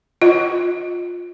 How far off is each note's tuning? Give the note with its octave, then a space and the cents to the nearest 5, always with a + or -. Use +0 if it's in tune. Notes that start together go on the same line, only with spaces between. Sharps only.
F4 +20 D#5 +0